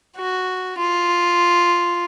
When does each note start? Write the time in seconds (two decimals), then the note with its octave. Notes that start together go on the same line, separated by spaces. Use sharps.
0.18 F#4
0.78 F4